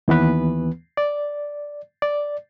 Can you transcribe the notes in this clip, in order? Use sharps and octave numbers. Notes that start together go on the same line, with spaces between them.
D#2 E3 B3 B4
D5
D5